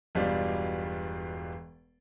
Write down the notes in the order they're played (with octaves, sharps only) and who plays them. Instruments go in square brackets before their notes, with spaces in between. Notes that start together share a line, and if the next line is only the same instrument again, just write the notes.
[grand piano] E1 G2 B2 G3 F4 D5